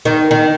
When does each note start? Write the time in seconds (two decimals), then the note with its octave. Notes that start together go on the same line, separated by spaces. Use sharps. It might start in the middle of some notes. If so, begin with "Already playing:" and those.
0.05 D#3
0.31 D#3